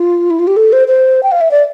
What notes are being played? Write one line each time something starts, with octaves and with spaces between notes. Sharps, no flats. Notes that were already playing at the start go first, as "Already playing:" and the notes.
Already playing: F4
E4
F4
G4
A4
C5
C5
G5
F5
E5
D5